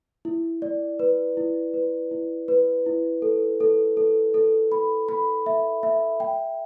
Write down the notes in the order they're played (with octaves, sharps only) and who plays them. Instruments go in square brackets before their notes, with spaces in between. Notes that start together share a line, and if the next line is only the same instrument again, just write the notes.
[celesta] E4
D5
B4
E4
B4
E4
B4
E4
A4
A4
A4
A4
B5
B5
E5
E5
G5